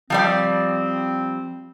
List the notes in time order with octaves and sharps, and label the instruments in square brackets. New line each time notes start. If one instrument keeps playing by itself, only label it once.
[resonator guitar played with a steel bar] F3 G3 D5 [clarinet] C4